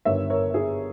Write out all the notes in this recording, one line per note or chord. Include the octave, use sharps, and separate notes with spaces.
G1 G2 D#3 C#5 E5
A#4 C#5
G#4